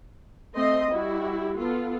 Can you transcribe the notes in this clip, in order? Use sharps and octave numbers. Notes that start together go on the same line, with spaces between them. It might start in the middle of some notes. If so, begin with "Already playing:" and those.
A3 C4 D#5 C6
G3 E4 F#4 G4
B3 F4 A4